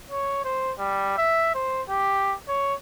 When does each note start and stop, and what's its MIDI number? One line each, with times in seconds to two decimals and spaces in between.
0.10 0.41 73
0.44 0.72 72
0.79 1.15 55
1.18 1.51 76
1.55 1.82 72
1.89 2.35 67
2.48 2.74 73